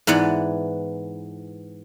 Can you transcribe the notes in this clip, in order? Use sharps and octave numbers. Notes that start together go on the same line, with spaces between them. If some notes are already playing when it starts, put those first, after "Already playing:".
G#2 E3 B3 D5 F#5